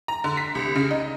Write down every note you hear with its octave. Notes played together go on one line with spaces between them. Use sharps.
A#5
D3
B6
C2
C#3
D#4